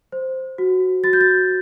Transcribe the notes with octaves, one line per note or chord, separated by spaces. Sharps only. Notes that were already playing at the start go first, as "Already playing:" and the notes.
C5
F#4
F#4 A6
G6
A6